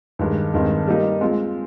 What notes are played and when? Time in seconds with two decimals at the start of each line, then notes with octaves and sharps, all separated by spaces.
0.19 G2 D#3 G#3
0.54 G2 D#3 G#3 C4
0.87 G3 A#3 D#4 A#4
1.21 G#3 C4 F4